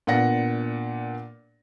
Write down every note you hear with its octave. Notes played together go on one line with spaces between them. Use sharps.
A#2 B3 D4 F#5 A#6